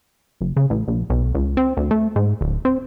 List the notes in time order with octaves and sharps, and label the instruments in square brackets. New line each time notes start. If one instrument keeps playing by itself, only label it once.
[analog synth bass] F#1
C#3
A1
A#1
B1
C#2
C4
D2
A3
G#2
D1
C4